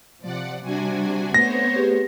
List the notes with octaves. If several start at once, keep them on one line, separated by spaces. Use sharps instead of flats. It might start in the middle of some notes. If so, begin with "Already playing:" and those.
C3 F3 D5 F#5
C3 G3 D4 F#4 G#5
A3 B3 C4 C5 C#5 A#6
G4 G#4 B4